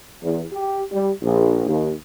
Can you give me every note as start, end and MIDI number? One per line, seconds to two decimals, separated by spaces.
0.23 0.42 40
0.53 0.81 67
0.92 1.10 55
1.22 1.63 34
1.67 1.91 39